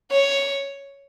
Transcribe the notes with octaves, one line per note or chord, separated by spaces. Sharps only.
C#5